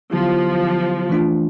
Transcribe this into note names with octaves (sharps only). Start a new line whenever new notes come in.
D3 F3 F#3 B3 E4 G4
E3 A3 D4 F4